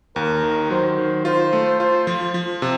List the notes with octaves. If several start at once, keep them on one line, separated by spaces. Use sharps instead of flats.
D#2 A#4
D#3
F#3 C5
D#3
F4 C5
A3
F4 C5
F3
F3
C3